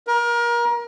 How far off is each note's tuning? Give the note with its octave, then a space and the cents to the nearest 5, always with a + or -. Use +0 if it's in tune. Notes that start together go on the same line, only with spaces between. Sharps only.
A#4 +30